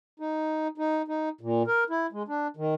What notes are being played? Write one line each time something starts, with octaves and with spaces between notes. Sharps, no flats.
D#4
D#4
D#4
A#2
A#4
E4
G#3
D4
D#3